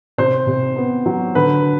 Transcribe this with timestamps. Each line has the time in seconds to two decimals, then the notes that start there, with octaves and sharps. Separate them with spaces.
0.18 C3 C5
0.47 C3
0.76 B3
1.06 F#3
1.35 D3 B4